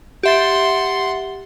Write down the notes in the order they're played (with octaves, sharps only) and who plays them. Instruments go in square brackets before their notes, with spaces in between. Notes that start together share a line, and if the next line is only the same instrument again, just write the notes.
[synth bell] G4 E5 A6 [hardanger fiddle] F#5 C6